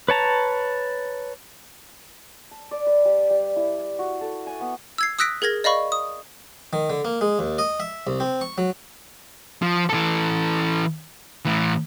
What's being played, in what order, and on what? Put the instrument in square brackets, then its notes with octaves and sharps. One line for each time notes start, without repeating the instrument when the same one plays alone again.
[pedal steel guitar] B4 C#5 A5 A#5
[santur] A5
D5
B4
G3
G3
E4
F#4
A4
G#5
B3
[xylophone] E6 G#6 C7
D#6 E6 F#6 A#6 B6 D7
G#4 A#4 G#6 A#6
D5 D#5 F5 B5 C#6
D#6
[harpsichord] D#3
D3
A#3
G#3
D#2
D#5
E5
C2
C4
C#6
F#3
[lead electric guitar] F3
E3 A4
A2 E3